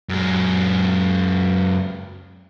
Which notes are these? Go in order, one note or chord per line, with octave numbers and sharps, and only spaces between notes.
F#2 G#3